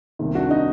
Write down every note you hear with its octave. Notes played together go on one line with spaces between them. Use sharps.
C2 C3 D#3
D4 F#4
D#4